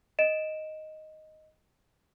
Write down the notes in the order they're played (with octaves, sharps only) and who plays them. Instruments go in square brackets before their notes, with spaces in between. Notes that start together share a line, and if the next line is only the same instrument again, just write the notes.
[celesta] D#5 D7 E7